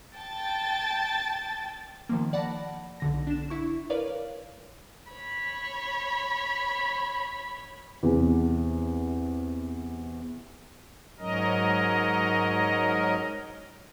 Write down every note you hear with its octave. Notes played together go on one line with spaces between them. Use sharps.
G5 A5 A6
D#3 F3 A#3
D5 F#5 A5 B5 A#6
B1 D3 A#6
D4 E7
E4 C#6
A#4 B4 C#5 D5 F5
C#5 B5
E2 C3
G#2 F#3 C#4 A#4 D#5